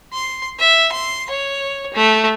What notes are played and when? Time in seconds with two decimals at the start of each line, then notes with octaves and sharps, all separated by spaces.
0.13 C6
0.59 E5
0.92 C6
1.30 C#5
1.93 A3